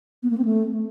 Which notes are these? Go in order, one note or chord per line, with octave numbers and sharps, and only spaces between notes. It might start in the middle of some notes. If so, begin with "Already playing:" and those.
B3
A#3
C4
A3